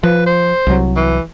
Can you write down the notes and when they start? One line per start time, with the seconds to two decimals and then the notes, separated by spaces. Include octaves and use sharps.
0.03 F3 B4
0.26 C5
0.67 C2 F#3
0.96 E3